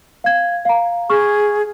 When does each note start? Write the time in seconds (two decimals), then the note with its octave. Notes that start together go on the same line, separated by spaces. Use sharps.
0.24 F5 G#6
0.65 F5 A#5
1.10 G#4 C#6 F6